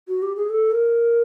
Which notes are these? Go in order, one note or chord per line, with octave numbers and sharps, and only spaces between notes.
F#4
G4
G#4
A4
A#4